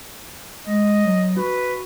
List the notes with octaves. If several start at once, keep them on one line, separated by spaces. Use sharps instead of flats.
G#3 D#5
F#3
F#4 B4